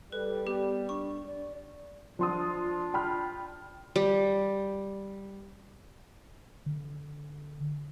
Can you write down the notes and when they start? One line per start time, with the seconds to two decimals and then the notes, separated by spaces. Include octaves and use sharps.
0.12 G3 A4 B4
0.47 B3 G4
0.89 D4 C#6
1.27 D5
2.19 F3 D4 F4 C6 D#6
2.94 G5 B5 F6
3.96 G3
6.66 D3